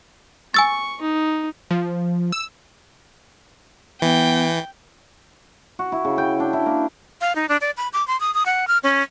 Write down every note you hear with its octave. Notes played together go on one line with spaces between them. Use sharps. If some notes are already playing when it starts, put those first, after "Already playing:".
G#5 C#6 E6 A6
D#4
F3
E6
E3 B3 G5
F#4
E4
C#3
G5
D4
E4
A#3
F5
D#4
D4
D5
B5
D6
C6
D#6
D#6
F#5
F6
C#4